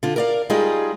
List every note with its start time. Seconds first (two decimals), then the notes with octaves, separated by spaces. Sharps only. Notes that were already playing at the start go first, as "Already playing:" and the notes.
0.03 D3 F4
0.16 A#4 D5 F5
0.50 G3 G#3 D#4 F4 G#4 D#5